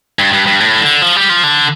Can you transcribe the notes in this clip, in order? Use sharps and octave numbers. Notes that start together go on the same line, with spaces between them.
G2
G2
G2
A2
D3
F3
G3
F3
D3